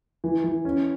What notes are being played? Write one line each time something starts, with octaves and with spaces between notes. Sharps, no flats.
E3
E3
C#4